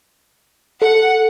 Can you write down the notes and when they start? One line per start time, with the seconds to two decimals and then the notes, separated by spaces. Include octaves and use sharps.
0.82 A4 F#5